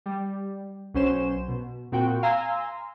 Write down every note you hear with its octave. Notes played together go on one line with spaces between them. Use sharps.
G3
B1 F#3 C#4 C5 C6 E7
B2
A#2 C4 F#4 G5
F5 G#5 A#5 C6 E6